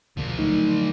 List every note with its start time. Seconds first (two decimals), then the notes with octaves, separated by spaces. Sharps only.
0.17 D2 B2 D3 F3 A#3
0.39 D3 F#3 A3 D#4